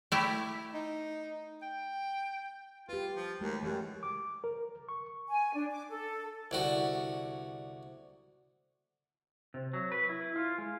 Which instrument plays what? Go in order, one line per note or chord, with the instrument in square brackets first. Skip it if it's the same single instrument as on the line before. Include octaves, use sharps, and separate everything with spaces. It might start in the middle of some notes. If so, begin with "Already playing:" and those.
[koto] A3 E4 G4
[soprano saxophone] D#4
G5
[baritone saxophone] F4 [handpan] G4 B4
[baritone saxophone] F3
[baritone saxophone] D#2 [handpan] G#3 A3 F#4
[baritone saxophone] F#2 [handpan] E3 G4
[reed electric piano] D6
A#4
C#6
[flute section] G#5
D4
D6
A4
[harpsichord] C2 D3 F#4
[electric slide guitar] C3
F#3
B4
E4
F4
G#3